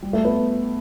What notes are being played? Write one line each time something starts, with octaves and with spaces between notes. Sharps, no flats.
G3
A3
B3